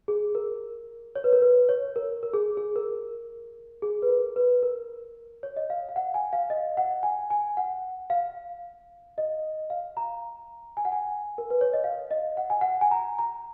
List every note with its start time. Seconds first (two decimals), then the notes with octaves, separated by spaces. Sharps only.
0.08 G#4
0.35 A#4
1.16 C#5
1.24 B4
1.33 A#4
1.42 B4
1.69 C#5
1.96 A#4
2.23 A#4
2.33 G#4
2.57 G#4
2.76 A#4
3.82 G#4
4.02 B4
4.09 A#4
4.36 B4
4.63 A#4
5.43 C#5
5.56 D#5
5.70 F5
5.89 F5
5.96 F#5
6.14 G#5
6.33 F5
6.50 D#5
6.77 F#5
7.03 G#5
7.30 G#5
7.57 F#5
8.10 F5
9.18 D#5
9.70 F5
9.97 A#5
10.77 G#5
10.85 F#5
10.92 G#5
11.38 A#4
11.50 B4
11.61 C#5
11.73 D#5
11.84 F5
12.11 D#5
12.37 F#5
12.50 G#5
12.61 F#5
12.81 G#5
12.91 A#5
13.19 A#5